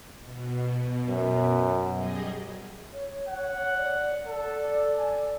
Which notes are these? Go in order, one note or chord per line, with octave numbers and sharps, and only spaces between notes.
B2
F#2
G3 G#4 D#5
C#5
F#5
D5
A4 D5
G#5